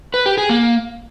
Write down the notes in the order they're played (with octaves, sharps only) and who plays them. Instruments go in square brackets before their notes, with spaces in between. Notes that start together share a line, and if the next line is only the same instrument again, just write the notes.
[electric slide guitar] B4
G4
G#4
A#3